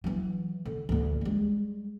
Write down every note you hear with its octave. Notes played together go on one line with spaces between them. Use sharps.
E3 F#3
D3
D2 D3
G3 G#3